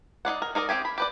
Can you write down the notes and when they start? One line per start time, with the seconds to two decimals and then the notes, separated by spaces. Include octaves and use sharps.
0.25 D#4 F4 D5 F#5
0.42 A#4
0.55 D#4 A#4 D5 D#5
0.69 C4 F4 G4 G#5
0.85 B5
0.98 G4 B4 D5